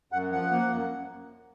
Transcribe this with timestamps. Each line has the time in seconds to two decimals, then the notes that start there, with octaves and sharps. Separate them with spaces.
0.12 F#2 F#5
0.32 F3 F#5
0.51 A#3
0.70 F#2